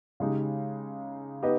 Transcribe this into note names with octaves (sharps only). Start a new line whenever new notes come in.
C#3 G#3 D#4 G4
B3 D#4 G4 B4 D#5